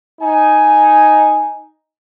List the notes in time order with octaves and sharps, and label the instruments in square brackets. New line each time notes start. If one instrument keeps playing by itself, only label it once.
[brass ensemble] D#4 G#5